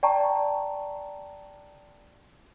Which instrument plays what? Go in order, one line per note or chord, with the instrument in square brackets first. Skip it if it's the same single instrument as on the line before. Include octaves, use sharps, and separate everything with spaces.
[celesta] D5 G5 A5 A#5 C#6